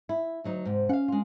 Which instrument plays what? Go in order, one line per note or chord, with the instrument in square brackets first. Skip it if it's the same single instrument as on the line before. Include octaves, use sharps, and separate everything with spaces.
[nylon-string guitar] E4
D2 F#3 D#4
G#2 C3
[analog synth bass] C#4 [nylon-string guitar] F5 F#5
[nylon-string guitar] G#3 F4